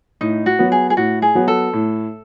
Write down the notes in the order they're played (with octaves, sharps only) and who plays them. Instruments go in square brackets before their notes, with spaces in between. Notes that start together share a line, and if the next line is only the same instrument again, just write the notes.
[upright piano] A2 [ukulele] D#4
[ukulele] F#4
[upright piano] F#3 B3
[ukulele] G#4
G#4
[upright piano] A2 [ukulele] F#4
[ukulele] G#4
[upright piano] F#3 B3
[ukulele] A4
[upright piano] A2